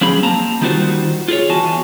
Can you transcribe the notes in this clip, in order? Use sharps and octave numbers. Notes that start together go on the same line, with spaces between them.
F3 F#3 C4 C#4 G#4 B5
A#3 C4 A5 A#5
D#3 G3 D#4 F4 F#4 C5
F4 G#4 A#4 C#5
E2 F#4 G#5 A5